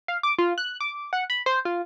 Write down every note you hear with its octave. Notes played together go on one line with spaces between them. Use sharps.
F5
D6
F4
F#6
D6
F#5
B5
C5
F4